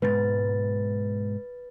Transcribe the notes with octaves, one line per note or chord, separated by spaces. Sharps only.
G#2 B2 G#3 B4 A6